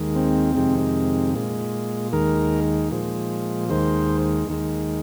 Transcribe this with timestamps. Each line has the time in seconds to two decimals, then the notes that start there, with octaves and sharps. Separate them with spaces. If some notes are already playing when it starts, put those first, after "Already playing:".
Already playing: D#2 D#3 G#3
0.16 C4
0.55 F2 C3 D#3 G#3
1.34 A#2 G#3
2.12 D#2 D#3 G#3 A#4
2.91 A#2 F3 G#3
3.69 D#2 D#3 G#3 C5
4.48 D#2 D#3 G#3